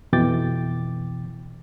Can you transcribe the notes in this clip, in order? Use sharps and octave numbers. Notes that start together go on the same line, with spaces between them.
F2 B2 E3 G5 D6 A6